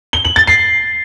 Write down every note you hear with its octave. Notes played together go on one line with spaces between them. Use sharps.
G7
F#7
A6
C7